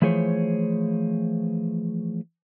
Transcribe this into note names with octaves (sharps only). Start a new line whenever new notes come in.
E3 F3 A3 G#4 C5 C#5